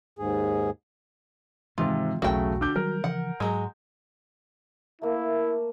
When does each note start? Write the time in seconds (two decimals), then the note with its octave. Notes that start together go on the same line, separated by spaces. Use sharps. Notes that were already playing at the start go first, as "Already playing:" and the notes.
0.19 D#2 G#2 G#4
1.78 G#2 C3 D#3 E3 G#3 F4
2.22 B1 E2 C#3 F#3 A3 F#4 G5
2.61 D3 D6 G6
2.76 D#3 F#3 G3 A#4
3.04 C#3 E3 F3 F#5
3.40 G#2 F#3 G#3
5.02 A3 A#3 E4